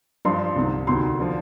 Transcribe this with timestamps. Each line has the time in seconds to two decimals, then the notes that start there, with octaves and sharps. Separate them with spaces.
0.25 G2 F3 C6
0.56 C2 C3 D#3
0.87 D2 C3 D#3 C6
1.19 D3 F3